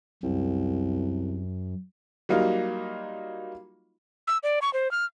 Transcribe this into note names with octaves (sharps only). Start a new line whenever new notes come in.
C2 F#2
F#3 G3 A#3 D#4 F4
E6
D5
C#6
C5
F6